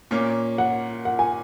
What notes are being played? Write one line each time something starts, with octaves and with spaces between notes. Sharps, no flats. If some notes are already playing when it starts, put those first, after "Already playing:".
A#2 A#3 C#4
F#5
F#5
G#5